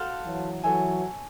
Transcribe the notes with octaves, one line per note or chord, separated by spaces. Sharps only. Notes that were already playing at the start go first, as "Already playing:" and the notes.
Already playing: F#4 A4 C5 F5
E3 F#3
E3 F#3 A4 C#5 E5 G#5